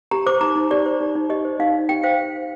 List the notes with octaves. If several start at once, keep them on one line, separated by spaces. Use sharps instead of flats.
G4 A#5
C5 D6
D#4 A#5
D#4
G4 D5
C5
D#4
D#4
G4 D#5
C5
D#4 F5
D#4
G4 G5
C5 F5